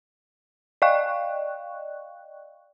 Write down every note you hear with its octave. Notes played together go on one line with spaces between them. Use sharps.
D5 D#5 F5 G5 C#6 F#6